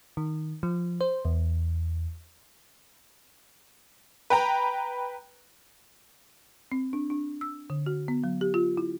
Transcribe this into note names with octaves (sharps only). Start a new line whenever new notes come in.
D#3
F3
C5
E2
B4 G5 A#5
C4
D4
D4
E6
D3
F#4
B3
F#3
G4
F4
E4